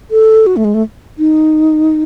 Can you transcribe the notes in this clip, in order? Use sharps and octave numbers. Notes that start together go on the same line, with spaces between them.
A4
F#4
A3
G#3
A3
D#4